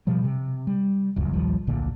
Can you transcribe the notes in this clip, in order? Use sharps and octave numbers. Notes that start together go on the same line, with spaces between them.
B2 F3 G3
C3
G3
D#1 C#2 F#2
A#1 D#2 F3 G3
D1 A#1 A#2 D3